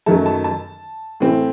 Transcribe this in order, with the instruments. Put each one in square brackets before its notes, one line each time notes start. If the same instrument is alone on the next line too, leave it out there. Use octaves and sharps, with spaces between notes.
[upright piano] F#2 D#3 F#3 A3 A5
A5
A5
A2 E3 C4